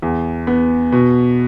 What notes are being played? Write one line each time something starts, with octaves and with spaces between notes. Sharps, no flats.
E2
B3
B2